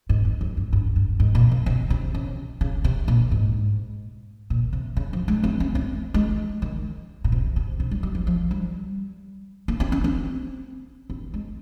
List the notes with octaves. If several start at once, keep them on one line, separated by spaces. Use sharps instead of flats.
G#2
G2
F2
G2
G2
G2
G#2
A#2
C3
C3
C3
C#3
C#3
C3
A#2
G#2
A#2
C3
C#3
F3
G#3
C4
C#4
C4
G#3
D#3
A#2
C3
C3
C3
G3
G3
F3
F3
G3
A#3
C4
C#4
C4
C4
G#3